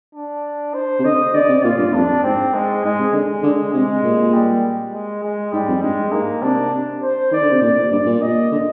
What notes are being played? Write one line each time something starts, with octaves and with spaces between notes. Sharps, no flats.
D4
C5
C3
D3 D#5
D3 D5
C3
A#2 F4
G2
F2 D4
G#2 C4
G#3
G#2 G#3
C3
D3 G#3
D3
C3 G#3
A#2
G3
G#3
G#3
G#2 G3
F2
G2 G#3
G#2 A#3
C3 D4
C5
D#3 D5
D3
C3
A#2 D5
G2 D5
A#2
D#5
D3